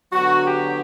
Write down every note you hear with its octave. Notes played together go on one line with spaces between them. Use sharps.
D3 F#3 B3 F#4
G4